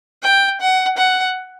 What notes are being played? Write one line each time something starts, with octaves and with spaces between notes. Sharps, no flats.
G5
F#5
F#5